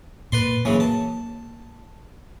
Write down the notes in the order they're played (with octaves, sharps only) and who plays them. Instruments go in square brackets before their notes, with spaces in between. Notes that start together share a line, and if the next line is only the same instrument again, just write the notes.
[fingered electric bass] A#2 [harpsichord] B4 D5 C6
[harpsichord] C#3 E3 F#3 [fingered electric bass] A#3
[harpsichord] A5